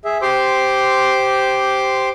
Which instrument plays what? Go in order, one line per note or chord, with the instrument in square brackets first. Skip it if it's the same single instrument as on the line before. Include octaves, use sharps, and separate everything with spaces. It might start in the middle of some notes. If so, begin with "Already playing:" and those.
[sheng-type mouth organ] G#4 E5
G4 C5 C6 D6